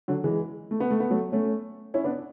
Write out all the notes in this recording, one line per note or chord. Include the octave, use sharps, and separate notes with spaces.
D3 F#3
E3 G#3
A3
B3
A3
B3
F#3 A3
A3 C#4
C#4 E4
B3 D4